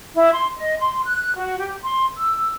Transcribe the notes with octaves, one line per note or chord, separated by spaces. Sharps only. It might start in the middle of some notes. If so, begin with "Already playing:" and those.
E4
C6
D#5
C6
F#6
F#4
G4
C6
E6